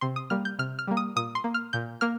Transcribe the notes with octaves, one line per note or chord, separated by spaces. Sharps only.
C3 C6
D#6
G3 A#3 F6
G6
C3 F6
F6
G3 A#3
D#6
A#2 D#6
C6
A#3
F6
A#2 G6
A#3 F6